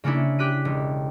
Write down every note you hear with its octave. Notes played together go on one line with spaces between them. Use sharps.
C#3 A#3 C#4 D4 E4
G4 F#6 B6 D#7
E1